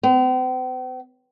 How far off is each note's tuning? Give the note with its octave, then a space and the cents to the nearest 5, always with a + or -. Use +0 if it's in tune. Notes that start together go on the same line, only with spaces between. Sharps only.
C4 -45